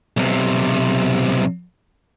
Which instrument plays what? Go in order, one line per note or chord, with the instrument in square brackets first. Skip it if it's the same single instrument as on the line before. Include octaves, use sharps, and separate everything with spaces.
[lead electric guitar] B1 C3